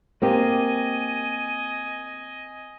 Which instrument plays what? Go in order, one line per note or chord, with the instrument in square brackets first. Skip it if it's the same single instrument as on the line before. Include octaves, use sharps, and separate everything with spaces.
[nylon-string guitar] A#3 C4 G4 [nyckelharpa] D#5 G#5